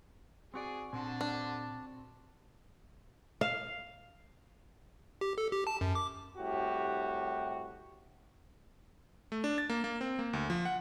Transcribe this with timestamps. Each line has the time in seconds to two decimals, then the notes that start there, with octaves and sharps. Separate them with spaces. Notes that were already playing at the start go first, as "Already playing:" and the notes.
0.54 C4 F#4 G#4 D5
0.93 A#2 D3 C4 F#4 C5 A5
1.21 D4
3.41 F5
5.21 G4
5.38 A4
5.52 G4
5.67 A5
5.81 F#2
5.95 D6
6.38 C2 A2 F#4 G4
9.32 A3
9.44 D4
9.58 A6
9.70 A#3
9.84 A#3
10.01 C4
10.19 A#3
10.33 D2
10.50 F3
10.65 F#5